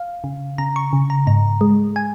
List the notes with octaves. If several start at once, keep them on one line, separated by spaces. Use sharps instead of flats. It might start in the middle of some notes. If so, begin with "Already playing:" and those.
Already playing: F5
C#3
C#3 A#5
C#6
C#3
A#5
G#2 A#5
G#3
G#5